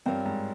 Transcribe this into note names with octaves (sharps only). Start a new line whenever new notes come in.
G2 C4 F4 A#4 C#5
G#2